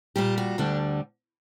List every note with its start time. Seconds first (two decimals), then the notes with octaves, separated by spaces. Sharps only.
0.16 A#2 G3 G4
0.38 F#4
0.58 D2 D3 G3 D4